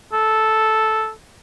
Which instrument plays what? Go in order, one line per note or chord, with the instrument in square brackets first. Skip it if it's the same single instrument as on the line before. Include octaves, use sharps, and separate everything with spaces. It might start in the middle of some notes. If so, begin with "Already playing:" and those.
[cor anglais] A4